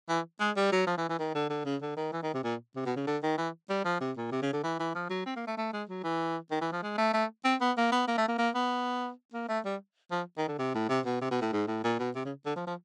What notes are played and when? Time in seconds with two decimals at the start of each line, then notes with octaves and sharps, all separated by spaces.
0.09 E3
0.40 G#3
0.56 G3
0.72 F#3
0.87 F3
0.98 E3
1.09 E3
1.19 D#3
1.34 D3
1.49 D3
1.65 C#3
1.82 D3
1.97 D#3
2.13 E3
2.23 D#3
2.34 C3
2.44 A#2
2.76 C3
2.86 B2
2.96 C#3
3.07 D3
3.23 D#3
3.38 E3
3.69 G3
3.85 F3
4.01 C3
4.17 A#2
4.32 C3
4.42 C#3
4.53 D3
4.63 E3
4.79 E3
4.95 F3
5.10 F#3
5.26 C4
5.36 A#3
5.47 A3
5.57 A3
5.73 G#3
5.89 F#3
6.04 E3
6.51 D#3
6.61 E3
6.72 F3
6.82 G#3
6.98 A3
7.14 A3
7.44 C4
7.61 B3
7.77 A#3
7.92 B3
8.08 A#3
8.18 A3
8.28 A#3
8.39 A#3
8.55 B3
9.34 A#3
9.49 A3
9.65 G3
10.11 F3
10.38 D#3
10.48 D3
10.59 C3
10.74 A2
10.89 C3
11.05 B2
11.21 C3
11.31 B2
11.41 A2
11.53 G#2
11.68 A2
11.84 A#2
11.99 B2
12.15 C3
12.25 C#3
12.45 D3
12.56 F3
12.67 F3